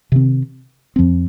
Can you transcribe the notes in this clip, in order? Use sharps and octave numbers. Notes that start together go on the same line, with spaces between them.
C3 D#3 C4
F2 F3 C4